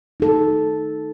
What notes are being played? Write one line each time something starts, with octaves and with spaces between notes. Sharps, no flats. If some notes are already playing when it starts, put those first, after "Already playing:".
D#4 A4